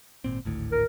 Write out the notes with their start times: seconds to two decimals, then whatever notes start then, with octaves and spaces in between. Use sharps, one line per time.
0.24 G#1 A#2 C4
0.45 G#1 D2 A2
0.72 A#4